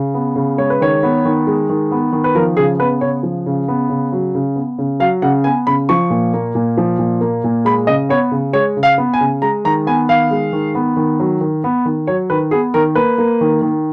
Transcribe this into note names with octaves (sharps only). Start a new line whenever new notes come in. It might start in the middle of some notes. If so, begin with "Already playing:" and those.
Already playing: C#3
B3
C#3
G#3 C#5
B4
D#3 C#5
B3
D#3
G#3
D#3
B3
D#3
B4
F3 A#4
C#3 G#4
B3 B4
C#3 C#5
F3
C#3
B3
C#3
F#3
C#3
B3
C#3
F#3 F5
C#3 F#5
B3 G#5
C#3 B5
F3 C#6
A#2
A#3
A#2
F3
A#2
A#3
A#2
G#3 B5
C#3 D#5
B3 C#5
C#3
G#3 C#5
C#3
F5
B3
G#5
C#3
G#3 A#5
D#3 A#5
B3 G#5
D#3 F5
G#3
D#3
B3
D#3
F#3
D#3
B3
D#3
F#3 C#5
D#3 B4
B3 G#4
D#3 A#4
A#3 B4
A#3
D#3
D#3